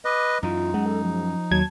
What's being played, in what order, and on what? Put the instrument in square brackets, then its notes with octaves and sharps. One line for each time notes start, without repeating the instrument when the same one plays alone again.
[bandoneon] B4 D#5 [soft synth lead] D6
[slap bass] F#2 E3 [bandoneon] D#4 [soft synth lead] F4
[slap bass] F#2 [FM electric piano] G#3 [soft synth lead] F#5
[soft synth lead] A4
F3
[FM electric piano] D#2 F#3 G#6 [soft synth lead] A5